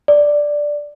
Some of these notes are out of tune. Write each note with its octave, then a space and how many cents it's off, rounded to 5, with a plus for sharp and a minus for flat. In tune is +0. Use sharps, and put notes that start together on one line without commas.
D5 +0